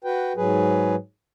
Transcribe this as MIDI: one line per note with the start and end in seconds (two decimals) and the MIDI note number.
0.04 0.33 66
0.04 0.33 71
0.04 0.33 79
0.37 0.95 44
0.37 0.95 54
0.37 0.95 68
0.37 0.95 71